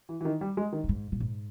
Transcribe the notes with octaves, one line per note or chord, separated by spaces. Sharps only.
E3
E3
D#3
G3
G#3
D#3
A#2
G#2
A#2
G#2